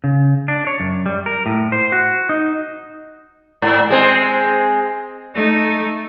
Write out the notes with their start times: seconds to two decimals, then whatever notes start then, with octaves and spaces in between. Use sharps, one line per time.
0.04 C#3
0.48 D4
0.67 C#5
0.80 F#2
1.06 G3
1.26 A#4
1.46 A2
1.72 C5
1.92 F#4
2.29 D#4
3.62 G#2
3.90 G#3 C4
5.35 A3 D#4